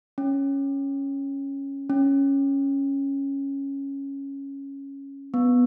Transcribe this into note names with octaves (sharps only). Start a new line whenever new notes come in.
C#4
C#4
B3